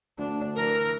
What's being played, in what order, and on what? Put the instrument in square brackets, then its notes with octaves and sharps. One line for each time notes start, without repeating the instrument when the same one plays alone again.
[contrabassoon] D2 [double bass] D4
[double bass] E3 [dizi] A#4